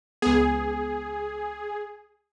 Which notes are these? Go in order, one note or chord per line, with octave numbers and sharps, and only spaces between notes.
C#2 B3 G#4